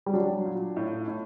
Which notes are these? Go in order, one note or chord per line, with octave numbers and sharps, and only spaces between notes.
G3
F#3 D4
A#2
A2
A2